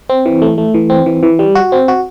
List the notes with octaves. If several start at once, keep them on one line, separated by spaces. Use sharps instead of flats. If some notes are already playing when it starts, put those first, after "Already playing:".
C4
E3
A3
A3
E3
C4
E3
E3
G3
F#4
C4
F#4